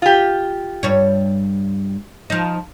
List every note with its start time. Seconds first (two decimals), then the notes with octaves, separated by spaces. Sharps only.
0.02 F4 G4
0.83 G2 G3 C#5
2.30 F3 D#4